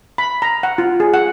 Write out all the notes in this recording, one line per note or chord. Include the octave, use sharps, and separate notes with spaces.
B5
A#5
F#5
F4
G#4
F#5